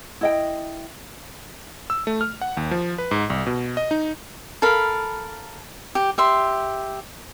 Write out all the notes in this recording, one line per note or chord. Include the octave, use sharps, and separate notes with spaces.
E4 D#5 G5
E6
A3
F6
F#5
D#2
F3
B4
G#2
C2
B2
D#5
D#4
A4 A#4 F5 B5
G4
G4 E5 C6